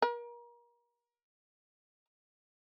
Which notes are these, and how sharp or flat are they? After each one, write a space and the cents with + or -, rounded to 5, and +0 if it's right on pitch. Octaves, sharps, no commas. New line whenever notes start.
A#4 +35